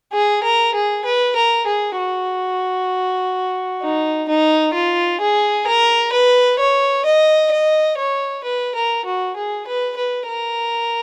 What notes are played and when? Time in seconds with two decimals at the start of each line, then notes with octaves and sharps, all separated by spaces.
0.13 G#4
0.44 A#4
0.75 G#4
1.05 B4
1.36 A#4
1.67 G#4
1.98 F#4
3.82 D#4
4.29 D#4
4.74 F4
5.21 G#4
5.67 A#4
6.12 B4
6.59 C#5
7.05 D#5
7.52 D#5
7.98 C#5
8.44 B4
8.75 A#4
9.05 F#4
9.37 G#4
9.67 B4
9.97 B4
10.28 A#4